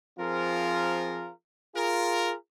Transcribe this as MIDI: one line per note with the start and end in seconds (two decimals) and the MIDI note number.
0.19 1.30 53
0.19 1.30 60
0.19 1.30 65
0.19 1.30 68
0.19 1.30 70
1.75 2.34 65
1.75 2.34 68
1.75 2.34 70